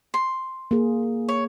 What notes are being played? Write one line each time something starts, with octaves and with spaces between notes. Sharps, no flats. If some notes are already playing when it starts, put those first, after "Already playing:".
C6
A#3 G#4
C#5